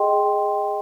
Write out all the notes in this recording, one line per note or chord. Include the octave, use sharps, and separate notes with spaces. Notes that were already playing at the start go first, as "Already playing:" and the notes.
Already playing: G#4 D#5 G5 C6